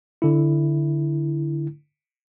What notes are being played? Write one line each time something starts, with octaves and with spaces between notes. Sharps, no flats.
D3 E4